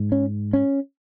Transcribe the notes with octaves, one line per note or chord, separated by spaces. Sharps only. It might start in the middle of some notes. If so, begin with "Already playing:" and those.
Already playing: G#2
C#4
C#4